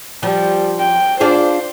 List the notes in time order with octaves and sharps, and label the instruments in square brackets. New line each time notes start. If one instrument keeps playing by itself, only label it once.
[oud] F3 [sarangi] G3
[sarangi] G5
[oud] D4 F4 G#4 [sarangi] C5